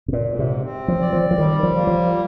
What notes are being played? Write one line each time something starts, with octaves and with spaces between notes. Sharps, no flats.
C3
A#2
G#2
C3
C4
F3
D5
F3
F3
D#3 G3
F3
A#3
F3